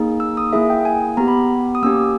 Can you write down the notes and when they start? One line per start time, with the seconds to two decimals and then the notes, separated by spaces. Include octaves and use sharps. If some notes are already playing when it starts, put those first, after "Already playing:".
Already playing: A#3 D#4 G#4
0.20 E6
0.37 D#6
0.53 A#3 E4 G#4 E5
0.70 G5
0.85 G#5
1.17 B3 G4 A#5
1.28 B5
1.75 D#6
1.82 A#3 C#4 G4 E6